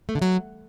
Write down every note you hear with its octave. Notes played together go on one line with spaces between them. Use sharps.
A3
D3
F#3